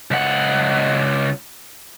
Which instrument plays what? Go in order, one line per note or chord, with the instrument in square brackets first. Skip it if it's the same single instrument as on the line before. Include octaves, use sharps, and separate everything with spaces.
[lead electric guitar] C#2 F#5